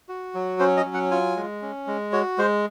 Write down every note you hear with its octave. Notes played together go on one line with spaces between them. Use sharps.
F#4
F#3
C#4 C5
D#5
F#3
F#5
F4 G#5
G#3
C#4
G#3
F#4 C#5
G#3 C5